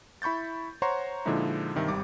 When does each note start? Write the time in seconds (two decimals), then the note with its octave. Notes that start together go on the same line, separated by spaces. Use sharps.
0.22 E4 B5 C#6 G6 A6
0.82 C5 C#5 F#5 A#5 C6 C#6
1.26 A#2 D3 F3 G#3 D#4 E4
1.75 G2 C3 D#3 E5
1.88 G#1 G3 D6